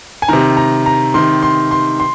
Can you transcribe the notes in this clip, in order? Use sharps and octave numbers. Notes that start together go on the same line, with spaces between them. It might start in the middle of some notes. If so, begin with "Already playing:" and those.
G#5
C3 D#3 A#5
A#5
A#5
C3 D#3 C6
C6
C6
C6